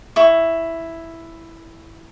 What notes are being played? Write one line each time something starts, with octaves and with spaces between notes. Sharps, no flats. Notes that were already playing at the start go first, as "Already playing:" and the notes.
E4 C#6